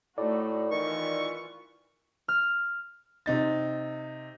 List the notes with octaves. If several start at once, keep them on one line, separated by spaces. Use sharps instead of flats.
A2 A3 D#4 F#4 D5
D#3 E3 F4 C#6
F6
C3 D#4 A6